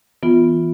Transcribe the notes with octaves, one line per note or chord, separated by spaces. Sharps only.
E3 B3 F4